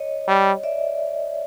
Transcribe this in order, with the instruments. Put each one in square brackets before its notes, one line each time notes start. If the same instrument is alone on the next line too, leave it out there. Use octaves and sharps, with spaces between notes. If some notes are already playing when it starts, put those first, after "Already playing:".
Already playing: [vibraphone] C#5 D#5
[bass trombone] G3
[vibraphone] D5 E5